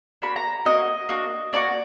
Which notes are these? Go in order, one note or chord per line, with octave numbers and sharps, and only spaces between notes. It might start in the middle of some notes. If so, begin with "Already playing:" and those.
A#3 D4 F#4 B5
A#5
A#3 D4 F#4 D#5
A#3 D4 F#4
A#3 D4 F#4 D5